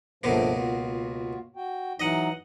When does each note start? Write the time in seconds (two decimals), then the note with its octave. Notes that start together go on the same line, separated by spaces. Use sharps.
0.23 C#2 G2 B2 F3 A3 A#3
0.56 F4 F#4
1.56 F#4 G5
2.00 E3 F#3 D#4 D#5 F#5